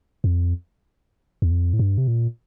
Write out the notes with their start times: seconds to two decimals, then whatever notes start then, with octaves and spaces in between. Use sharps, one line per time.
0.24 F2
1.42 E2
1.51 F2
1.73 A2
1.79 G2
1.98 C3
2.08 A#2